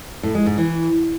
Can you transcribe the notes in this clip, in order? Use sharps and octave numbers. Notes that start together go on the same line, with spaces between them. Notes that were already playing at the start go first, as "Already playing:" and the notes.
A2
G#3
G#2
E3